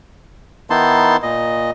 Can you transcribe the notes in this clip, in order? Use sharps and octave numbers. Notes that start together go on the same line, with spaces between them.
D#3 B3 D#4 E4 A5 C6
A#2 D#5